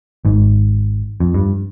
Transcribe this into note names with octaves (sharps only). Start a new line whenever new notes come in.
G#1 G#2
F2
G2